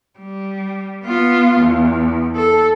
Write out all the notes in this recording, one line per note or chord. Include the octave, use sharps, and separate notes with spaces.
G3
B3 F4
E2
A4